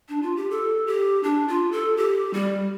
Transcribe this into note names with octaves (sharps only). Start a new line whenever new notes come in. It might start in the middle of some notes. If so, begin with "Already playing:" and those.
D4
F4
G4
A4
G4
D4
F4
A4
G4
G3